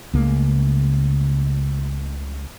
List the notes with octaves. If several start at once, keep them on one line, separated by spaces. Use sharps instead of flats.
C#2 C#3 A3 A#3